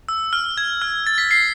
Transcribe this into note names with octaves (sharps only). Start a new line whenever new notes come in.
E6
F6
G#6
F6
A6
B6
C7